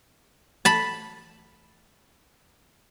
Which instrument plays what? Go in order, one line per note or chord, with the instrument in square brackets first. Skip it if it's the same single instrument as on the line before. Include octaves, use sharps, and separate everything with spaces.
[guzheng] A5 B5